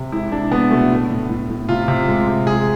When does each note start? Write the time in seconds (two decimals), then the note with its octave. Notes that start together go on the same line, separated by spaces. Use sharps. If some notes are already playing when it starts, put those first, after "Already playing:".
Already playing: C3
0.12 G#3 E4
0.32 G#3 D4
0.52 G#3 B3
0.71 B2 A3
0.90 A2
1.10 A2
1.30 A2
1.50 A2
1.69 C3 F4
1.88 C3
2.08 G#3
2.28 C3
2.47 G#3 G#4